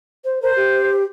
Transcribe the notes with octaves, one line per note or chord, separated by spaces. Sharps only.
C5
A#4 C5
G4